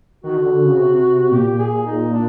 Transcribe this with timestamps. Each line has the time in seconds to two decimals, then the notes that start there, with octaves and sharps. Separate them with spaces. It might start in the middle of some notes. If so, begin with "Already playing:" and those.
0.24 D#3 F#4
0.37 D3
0.52 D3
0.65 C#3
0.78 C3
1.31 A#2 G4
1.59 G#4
1.86 D#4
2.13 D4